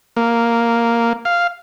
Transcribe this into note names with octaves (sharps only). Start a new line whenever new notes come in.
A#3
F5